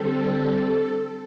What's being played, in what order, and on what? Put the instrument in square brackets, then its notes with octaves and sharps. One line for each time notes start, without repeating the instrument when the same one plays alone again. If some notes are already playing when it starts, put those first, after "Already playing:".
Already playing: [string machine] D3 G3 C4 A4